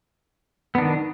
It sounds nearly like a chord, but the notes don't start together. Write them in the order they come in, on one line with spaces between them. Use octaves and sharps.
B3 D4 D#3